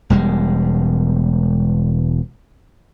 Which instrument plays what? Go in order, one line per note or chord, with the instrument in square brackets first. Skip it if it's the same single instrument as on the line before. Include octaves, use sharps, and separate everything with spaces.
[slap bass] E1 G3 G#3